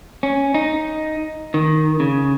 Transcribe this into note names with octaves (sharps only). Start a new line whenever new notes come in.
C#4
D#4
D#3
C#3